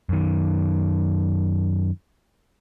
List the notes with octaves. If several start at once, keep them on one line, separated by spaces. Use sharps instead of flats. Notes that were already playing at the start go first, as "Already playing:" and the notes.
F#2 D#3